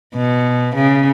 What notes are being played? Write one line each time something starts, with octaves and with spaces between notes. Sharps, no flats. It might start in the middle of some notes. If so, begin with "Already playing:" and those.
B2
C#3